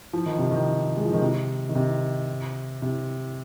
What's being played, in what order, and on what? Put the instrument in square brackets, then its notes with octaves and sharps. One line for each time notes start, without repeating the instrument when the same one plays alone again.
[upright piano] F3
D#3
C3
D#3
G#3
F3
D#3
C3
D#3
C3
C3